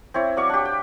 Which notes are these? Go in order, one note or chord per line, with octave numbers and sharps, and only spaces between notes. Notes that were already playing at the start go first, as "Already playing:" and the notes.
C4 E4 C#5
F#3 D5 F5 C#6
D4 G4
G5